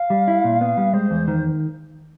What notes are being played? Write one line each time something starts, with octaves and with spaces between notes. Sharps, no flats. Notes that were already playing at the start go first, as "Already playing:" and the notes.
Already playing: F5
G3
E4
A#2
B3
G3
G#3 C5
E2
D#3